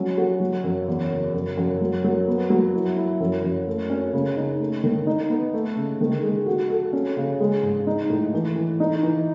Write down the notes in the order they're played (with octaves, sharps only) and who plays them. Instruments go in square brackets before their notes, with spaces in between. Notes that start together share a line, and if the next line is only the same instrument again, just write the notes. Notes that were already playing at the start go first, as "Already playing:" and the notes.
Already playing: [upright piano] F#3 C#4
F#4
F#3
F#2
E2
C#3
F#2
F#2
F#3
F#3
B3
F#3
E4
E4
F#2
F#2
A3
C#4
C#3
D#4
A3
D#3
D#4
B3
A3
C#3
D#3
G#3
F#4
A4
C#4
C#3
G#3
G#2
D#4
A2
E3
E3
D#4
E3